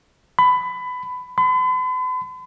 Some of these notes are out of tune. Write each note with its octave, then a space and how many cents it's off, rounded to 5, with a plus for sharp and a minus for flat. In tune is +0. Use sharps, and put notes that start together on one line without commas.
B5 +20
B5 +45